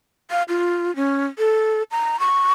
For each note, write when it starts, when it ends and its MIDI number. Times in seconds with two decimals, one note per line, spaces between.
0.31 0.43 77
0.49 0.94 65
0.96 1.26 61
1.39 1.83 69
1.91 2.20 82
2.20 2.52 85